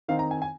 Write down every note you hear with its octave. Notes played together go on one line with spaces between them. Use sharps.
D#3 C4 D#4 F5
A#5
G#5
G#5